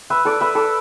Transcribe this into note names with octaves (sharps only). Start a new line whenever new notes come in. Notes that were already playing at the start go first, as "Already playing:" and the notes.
B4 E5
A4 D5
B4 E5
A4 D5